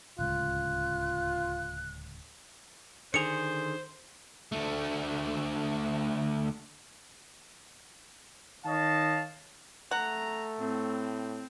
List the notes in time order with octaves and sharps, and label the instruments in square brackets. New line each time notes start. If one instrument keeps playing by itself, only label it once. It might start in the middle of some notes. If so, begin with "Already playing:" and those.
[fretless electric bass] D1 C#2 C#3 [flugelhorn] F4 [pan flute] F#6
[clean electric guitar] D3 D#3 G#4 [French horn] C5 [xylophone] C#7 F7
[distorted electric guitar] D2 A3
[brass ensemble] D#3 C#5 D#5 F5 A5
[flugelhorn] A3 [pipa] F#5 [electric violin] A#5
[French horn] A2 [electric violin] C4